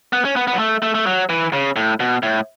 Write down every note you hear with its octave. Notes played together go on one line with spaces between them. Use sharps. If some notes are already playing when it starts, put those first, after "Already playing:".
B3
C#4
B3
B3
F#3
A3
A3
A3
F#3
E3
C#3
A2
B2
A2